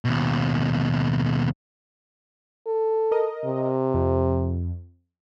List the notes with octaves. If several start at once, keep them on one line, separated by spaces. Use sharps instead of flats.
D#2 B2
A4
A#4 D#5
C3
F2